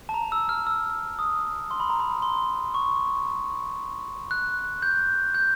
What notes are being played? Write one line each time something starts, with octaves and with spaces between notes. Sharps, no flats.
A5
A#5
E6
F6
E6
D#6
C6
B5
A#5
B5
C6
C#6
F#6
G6
G6